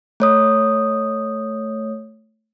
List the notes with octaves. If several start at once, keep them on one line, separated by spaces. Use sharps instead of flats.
A3 C#5 D#6